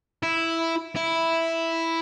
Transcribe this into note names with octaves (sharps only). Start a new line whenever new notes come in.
E4
E4